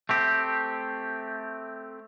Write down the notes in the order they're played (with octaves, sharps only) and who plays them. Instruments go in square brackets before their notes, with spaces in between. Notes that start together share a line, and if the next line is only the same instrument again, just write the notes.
[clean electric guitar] A3 C4 G4